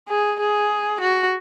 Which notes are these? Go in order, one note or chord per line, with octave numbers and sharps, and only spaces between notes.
G#4
G#4
F#4